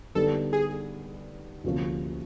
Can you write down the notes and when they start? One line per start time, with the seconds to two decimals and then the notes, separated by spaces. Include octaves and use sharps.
0.15 D3 G3 B3 D#4 G4 A4
0.53 G#4
1.64 D2 C3 F3 A#3 C#4